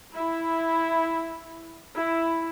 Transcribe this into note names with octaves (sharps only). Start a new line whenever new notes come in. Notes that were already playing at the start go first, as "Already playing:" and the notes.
E4
E4